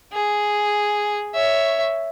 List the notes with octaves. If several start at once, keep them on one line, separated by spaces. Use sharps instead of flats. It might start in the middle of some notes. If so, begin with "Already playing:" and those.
G#4
C#5 E5